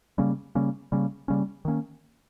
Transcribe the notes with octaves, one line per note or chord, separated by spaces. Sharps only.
C#3 G3 A#3 C#4
C#3 G3 A#3 C#4
C#3 G3 A#3 C#4
C#3 G3 A#3 C#4
D#3 A#3 C#4